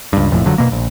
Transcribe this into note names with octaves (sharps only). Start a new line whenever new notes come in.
C#2 G2
F1 A#1 F2 A2
F#1 F2 D3 F#3
B2 A#3
A#1